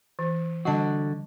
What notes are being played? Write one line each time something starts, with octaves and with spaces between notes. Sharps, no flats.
E3
D3 G3 F#4 D#5 A5